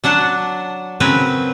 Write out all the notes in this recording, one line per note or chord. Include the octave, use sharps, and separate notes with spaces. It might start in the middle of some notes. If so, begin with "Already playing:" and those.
F#3 D4 F#5 A5
C#3 F#3 C4 A#4 B4